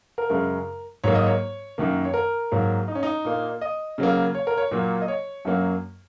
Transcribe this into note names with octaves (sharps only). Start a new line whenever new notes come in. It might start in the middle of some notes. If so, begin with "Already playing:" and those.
A#4
F#2 C#3 G#3 A#4
G#2 F#3 A#3 C#5
D#5
C#5
F#2 D#3 A#3
C#5
A#4
G#2 F#3 A#3
D#4
C#4
D#4
A#2 A#3
D#5
C#3 F#3 A#3
C#5
A#4
C#5
A#2 F#3 A#3
D#5
C#5
F#2 F#3 A#3